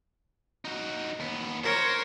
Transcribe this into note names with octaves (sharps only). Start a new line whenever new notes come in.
D#4 F#4
D#2 B3
A#4 C5 C#5